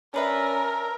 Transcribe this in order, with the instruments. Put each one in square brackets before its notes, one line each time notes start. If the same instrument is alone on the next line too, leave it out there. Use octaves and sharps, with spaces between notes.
[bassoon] C#4 [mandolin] D4 B4 E5 [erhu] A#4